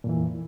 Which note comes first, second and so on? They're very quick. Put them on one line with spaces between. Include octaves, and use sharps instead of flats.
A#2 F2 E3